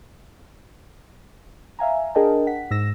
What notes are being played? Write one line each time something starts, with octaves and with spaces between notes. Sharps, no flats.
E5 F5 G#5 A#5
D4 G#4 A#4 D#5 G5 A5
F#5 B6
G#2 E6 A#6 E7